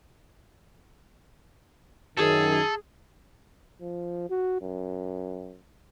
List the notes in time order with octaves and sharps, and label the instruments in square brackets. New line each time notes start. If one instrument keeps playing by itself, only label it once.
[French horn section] F#2 D#3 [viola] G#4 [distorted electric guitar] A4
[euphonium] F3
F#4
F#2